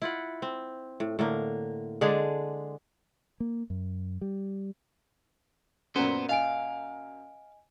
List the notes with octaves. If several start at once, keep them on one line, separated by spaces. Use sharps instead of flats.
E4 F4 F#5
C4
A2
A2 D3 A#3
D3 G#3 D4 G#4
A#3
F#2
G3
F#2 A#2 B3 C5
D#5 F5 G#5 D7